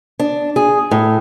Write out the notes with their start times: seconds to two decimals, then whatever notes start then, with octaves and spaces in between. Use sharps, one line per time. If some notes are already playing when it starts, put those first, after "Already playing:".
0.19 D4
0.56 G#4
0.91 A2